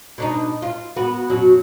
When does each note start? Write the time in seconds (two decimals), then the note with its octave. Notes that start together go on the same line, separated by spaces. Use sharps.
0.18 B2 D4 D#4
0.62 F4
0.96 B3 F#4 B4
1.30 F#2 B2 F#3